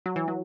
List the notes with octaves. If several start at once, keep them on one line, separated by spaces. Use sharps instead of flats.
F#3
E3
F#3